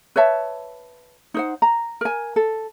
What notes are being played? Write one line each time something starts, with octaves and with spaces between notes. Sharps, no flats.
B4 C#5 E5 A5
D#4 C5 F#5
A#5
A#4 G#5
A4